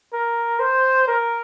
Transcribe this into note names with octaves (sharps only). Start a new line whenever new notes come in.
A#4
C5
A#4